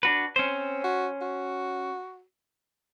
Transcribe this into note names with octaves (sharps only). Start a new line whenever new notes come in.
D4 F#4 B4
C4 C#4 C5
F#4
F#4